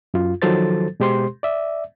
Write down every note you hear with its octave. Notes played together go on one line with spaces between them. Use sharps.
F#2 F4
D#3 F3 F#3 A4 C5 A6
B2 G#3 G4 C5 C6
D5 E5